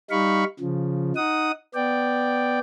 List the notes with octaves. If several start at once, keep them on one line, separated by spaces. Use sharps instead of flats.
G3 D#4 F5 B5 C#6
C#3 F3
D#4 F#5 D#6
B3 D5 G5